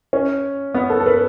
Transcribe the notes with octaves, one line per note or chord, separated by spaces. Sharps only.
C#4
B3
A4
A4
B4